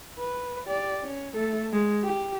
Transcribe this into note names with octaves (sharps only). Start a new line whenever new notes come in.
B4
G4 D5
C#4
A3 A4
G#3
G4